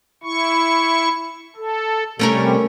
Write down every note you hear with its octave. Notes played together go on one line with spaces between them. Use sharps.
E4 C#6
A4
C3 G3 A3 C#4 A#4